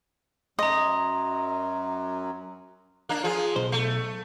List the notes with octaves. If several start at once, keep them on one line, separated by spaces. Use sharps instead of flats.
F#2 F#3 D#5 A#5 C6
A#3 D4
F3 F4 G#4
B1 C5
A3